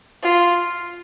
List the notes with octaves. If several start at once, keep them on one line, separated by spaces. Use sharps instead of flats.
F4